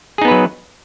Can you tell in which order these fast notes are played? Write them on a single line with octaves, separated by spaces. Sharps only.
G#4 D#4 B3 B4 F#3